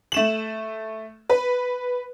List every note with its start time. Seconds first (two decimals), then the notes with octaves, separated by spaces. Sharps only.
0.12 A3 E7 F#7
1.30 B4